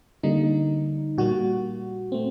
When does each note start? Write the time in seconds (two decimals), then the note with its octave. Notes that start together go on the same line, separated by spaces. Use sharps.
0.23 D3 G3 A#3 D#4
1.18 A#2 G3 A#3 F#4
2.12 A3 C4